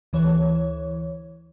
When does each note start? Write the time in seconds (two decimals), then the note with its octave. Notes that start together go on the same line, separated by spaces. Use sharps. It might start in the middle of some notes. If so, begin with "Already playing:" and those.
0.13 D2 E3 C#5